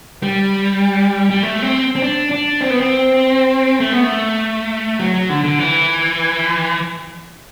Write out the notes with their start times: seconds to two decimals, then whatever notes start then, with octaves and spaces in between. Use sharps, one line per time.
0.23 G3
1.30 G3
1.43 A3
1.62 C4
1.96 C4
2.02 D4
2.31 D4
2.61 C4
2.70 B3
2.80 C4
3.80 A3
3.92 B3
4.04 A3
4.99 F#3
5.14 F#3
5.30 D3
5.44 D3
5.59 E3